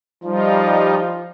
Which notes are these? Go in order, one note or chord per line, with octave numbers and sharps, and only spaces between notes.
F3 G3 D#4 F4